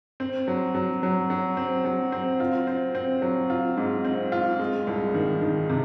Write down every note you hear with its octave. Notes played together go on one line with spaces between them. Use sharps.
C4
F#3
F#3
F#3
F#3
C4
F#3
C4
F4
C4
C4
F#3
F4
G#2
C4
F4
G#3
C2
D#3
D#3
C3